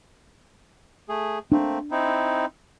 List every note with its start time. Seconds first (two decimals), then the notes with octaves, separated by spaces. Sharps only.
1.09 A3 G#4
1.52 A3 A#3 C4 D4
1.91 C4 D#4 E4